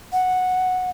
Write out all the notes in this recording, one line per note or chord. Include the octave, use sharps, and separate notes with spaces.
F#5